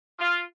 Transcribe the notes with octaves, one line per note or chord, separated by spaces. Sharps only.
F4